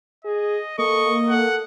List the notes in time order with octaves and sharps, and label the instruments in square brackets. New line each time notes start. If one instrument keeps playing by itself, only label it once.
[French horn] G#4 [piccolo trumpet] D#5
[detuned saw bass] A#3 [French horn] A4 [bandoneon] D#5 [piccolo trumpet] C#6
[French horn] A4 [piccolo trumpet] F#5